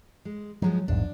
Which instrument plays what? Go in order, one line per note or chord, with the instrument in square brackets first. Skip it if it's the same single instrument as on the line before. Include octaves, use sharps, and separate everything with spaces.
[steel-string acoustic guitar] G#3
[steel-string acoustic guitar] F3 G#3 B3 [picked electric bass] F#3
[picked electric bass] A#1 E2 G#2 [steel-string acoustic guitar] D4